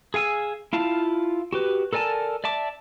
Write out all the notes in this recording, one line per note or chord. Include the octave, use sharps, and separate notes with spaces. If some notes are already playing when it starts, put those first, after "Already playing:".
G#4 F5 G#5 E6
E4 F4 F5 A5
F#4 G4 B4
A4 A#4 D5 G#5 A5
D5 E5 A5 D6